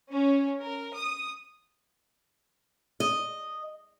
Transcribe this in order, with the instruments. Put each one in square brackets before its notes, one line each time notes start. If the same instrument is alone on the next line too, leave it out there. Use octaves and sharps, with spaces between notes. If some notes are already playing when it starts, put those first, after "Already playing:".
[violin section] C#4
A#4
D#6
[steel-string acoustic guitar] D#5